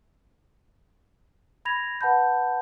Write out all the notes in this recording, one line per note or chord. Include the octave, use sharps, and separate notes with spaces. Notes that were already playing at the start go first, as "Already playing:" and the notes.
B5 G#6 A#6 F7
B4 F#5 A5 B5 G6